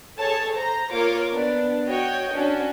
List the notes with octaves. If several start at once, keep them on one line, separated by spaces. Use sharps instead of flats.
G#4 A4 C#5 A5
C5 A#5
A#3 F4 A#4 C#5 D6
B3 D4
F#4 C#5 D#5 G5
C#4 D4 F#4